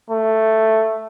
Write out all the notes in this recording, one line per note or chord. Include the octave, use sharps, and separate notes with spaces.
A3